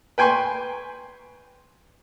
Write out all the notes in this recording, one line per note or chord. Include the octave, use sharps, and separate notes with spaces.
B4 G5 G#5 C6 C#6